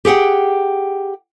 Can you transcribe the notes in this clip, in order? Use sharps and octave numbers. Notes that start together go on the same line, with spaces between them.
G4 G#4 F#5 G5